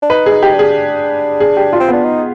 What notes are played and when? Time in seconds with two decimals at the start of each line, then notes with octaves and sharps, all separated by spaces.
0.02 D4
0.10 D#4 B4
0.26 D#4 G#4
0.43 G4
0.54 D4
0.59 G#4
1.40 G#4
1.57 G4
1.73 F4
1.80 C4
1.89 B3 D4
2.05 D#4